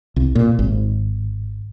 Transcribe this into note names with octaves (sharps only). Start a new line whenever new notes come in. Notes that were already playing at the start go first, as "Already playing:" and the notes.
C2
A#2
G#1